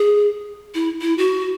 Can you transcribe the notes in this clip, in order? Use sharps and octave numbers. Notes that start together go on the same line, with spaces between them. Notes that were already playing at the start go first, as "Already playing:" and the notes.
Already playing: G#4
E4
E4
F#4